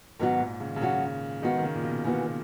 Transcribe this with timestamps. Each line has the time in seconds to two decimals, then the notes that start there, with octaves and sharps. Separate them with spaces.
0.19 G#2 D#3 F#3 B3 F#4
0.40 A#2
0.60 C#3
0.69 D#3
0.76 C#3
0.81 F#3 C#4 F#4
1.42 D#3 G#3 B3 F#4
1.58 D#3
1.63 C#3
1.75 A#2
1.83 B2
2.04 A#2 C#3 E3 B3 F#4